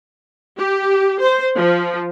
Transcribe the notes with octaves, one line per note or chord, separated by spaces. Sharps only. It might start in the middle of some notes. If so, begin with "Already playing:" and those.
G4
C5
F3